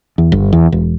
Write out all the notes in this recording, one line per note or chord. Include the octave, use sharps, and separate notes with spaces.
E2
G1
E2
E1